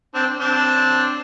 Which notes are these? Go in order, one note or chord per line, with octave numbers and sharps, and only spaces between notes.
C4 D4
C4 D4